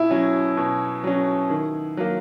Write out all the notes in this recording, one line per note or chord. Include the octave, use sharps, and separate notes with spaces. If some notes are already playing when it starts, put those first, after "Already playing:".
Already playing: B2 E4
F#3 C#4
B2
F#3 C#4
D#3
F#3 A#3